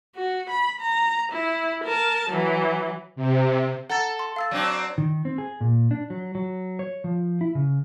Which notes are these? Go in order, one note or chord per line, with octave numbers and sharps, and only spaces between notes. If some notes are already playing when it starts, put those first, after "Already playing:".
F#4
B5
A#5
E4
A#4 A5
E3 F#3
C3
A4 F#5 A#5 A6
C6
F5 E6 A6
F#3 C4 D4
D#3
C4
G#4
A#2
D4
F#3
F#3
C#5
F3
E4
C#3